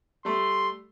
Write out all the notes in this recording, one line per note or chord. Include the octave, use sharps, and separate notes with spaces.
G3 A3 C6